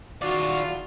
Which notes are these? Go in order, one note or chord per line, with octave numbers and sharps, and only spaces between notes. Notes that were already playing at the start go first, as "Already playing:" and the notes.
E2 D#3 F4 F#4 D5